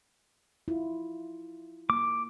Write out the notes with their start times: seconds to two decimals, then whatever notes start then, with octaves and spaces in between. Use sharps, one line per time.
0.68 E4 F4
1.90 A#3 D6